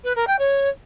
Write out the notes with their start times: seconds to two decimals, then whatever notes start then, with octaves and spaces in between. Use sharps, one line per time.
0.04 B4
0.15 A#4
0.27 G5
0.39 C#5